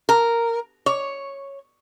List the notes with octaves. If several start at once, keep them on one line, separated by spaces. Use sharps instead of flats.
A#4
C#5